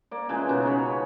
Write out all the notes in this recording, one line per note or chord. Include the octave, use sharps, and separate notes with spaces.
A#3 D5
C#3 E3 F3 G#3
B2 C#4 D#4
C#3 C#5 B5